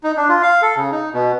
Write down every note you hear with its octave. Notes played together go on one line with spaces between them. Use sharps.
D#4
D4
F4
F5
A4
C#3
D#4
B2